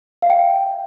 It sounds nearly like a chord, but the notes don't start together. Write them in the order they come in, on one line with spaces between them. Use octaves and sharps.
F5 E5 G5